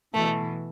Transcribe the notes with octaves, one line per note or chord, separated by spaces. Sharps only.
B2 E3 A3